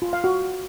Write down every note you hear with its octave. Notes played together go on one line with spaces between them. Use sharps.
F4
F5
F#4